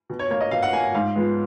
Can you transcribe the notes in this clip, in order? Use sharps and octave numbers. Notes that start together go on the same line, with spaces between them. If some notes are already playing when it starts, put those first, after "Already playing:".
B2
C#5
A#3 C#5
D#5
B2 F5
F#5
A#3 G#5
F#5
G#2 F5
F3 G#3 B3